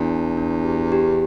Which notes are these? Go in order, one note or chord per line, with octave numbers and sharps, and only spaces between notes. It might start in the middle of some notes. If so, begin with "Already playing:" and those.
Already playing: E2 D4
A5
D4
G4
G4